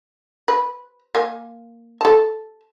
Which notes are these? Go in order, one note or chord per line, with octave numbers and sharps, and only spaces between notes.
B4
A#3 G#5
A4 A5